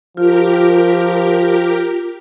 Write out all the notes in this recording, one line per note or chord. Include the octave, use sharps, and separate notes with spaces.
F3 F4 G4 A#4